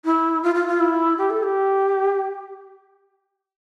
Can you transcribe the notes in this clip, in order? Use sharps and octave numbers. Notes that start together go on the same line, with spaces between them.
E4
F4
F4
F4
E4
G4
A4
G4